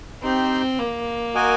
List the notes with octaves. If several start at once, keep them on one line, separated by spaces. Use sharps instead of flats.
C4 D#4 G4 C5
A#3
F#4 A#4 D#5 G#5